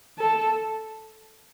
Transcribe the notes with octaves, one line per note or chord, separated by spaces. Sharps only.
A4